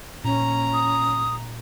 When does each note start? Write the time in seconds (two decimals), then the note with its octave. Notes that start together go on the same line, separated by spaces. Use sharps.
0.24 A#2 C#4 A#5
0.74 D#6